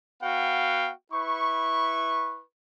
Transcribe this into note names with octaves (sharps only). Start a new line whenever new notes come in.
B3 F#4 F5 G5
E4 B4 C#6